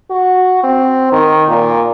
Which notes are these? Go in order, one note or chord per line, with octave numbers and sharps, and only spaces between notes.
F#4
C4
D#3
A#2